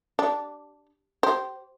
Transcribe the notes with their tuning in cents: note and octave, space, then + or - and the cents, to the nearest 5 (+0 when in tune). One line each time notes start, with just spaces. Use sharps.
D4 +0 G4 -20
G4 -30 C5 +0